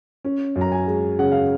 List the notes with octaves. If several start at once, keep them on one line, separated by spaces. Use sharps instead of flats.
C#4
F#2
A#5
G#5
G#3
C#3 F#5
F5